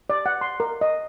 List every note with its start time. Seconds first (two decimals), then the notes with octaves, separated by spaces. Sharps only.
0.10 D5
0.26 F#5
0.41 C6
0.60 A#4
0.81 D#5